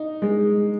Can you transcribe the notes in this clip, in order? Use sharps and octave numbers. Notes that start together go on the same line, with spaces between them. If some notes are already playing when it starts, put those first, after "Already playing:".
Already playing: D#4
G#3